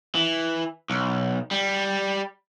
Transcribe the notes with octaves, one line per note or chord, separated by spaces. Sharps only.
E3
B1
G3